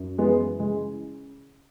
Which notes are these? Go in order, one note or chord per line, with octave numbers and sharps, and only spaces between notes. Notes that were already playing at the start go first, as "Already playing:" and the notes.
Already playing: F#2
E3 G#3 B3
C#3 G#3